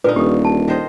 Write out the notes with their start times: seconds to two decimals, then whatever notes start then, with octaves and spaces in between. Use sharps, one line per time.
0.04 A#2 D3 D#4 B4
0.16 D#1 G4 A4
0.45 A5
0.68 D#3 C5 D#5